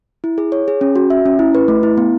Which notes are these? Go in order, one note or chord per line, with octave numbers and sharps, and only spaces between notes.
E4
G#4
C#5
G#4
C#4
F#4
E5
C#4
E4
B4
A3
E4
B3